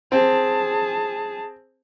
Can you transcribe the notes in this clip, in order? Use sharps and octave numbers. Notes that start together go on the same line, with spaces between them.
C4 G#4 A5